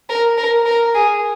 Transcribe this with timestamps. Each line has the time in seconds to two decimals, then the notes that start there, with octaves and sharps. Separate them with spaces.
0.09 A#4
0.38 A#4
0.66 A#4
0.95 G#4